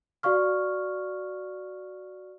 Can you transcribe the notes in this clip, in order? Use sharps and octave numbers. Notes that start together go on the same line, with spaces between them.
F#4 D5 F5 C#6 F6